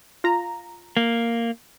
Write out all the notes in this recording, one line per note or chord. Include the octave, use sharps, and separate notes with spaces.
F4 A#5
A#3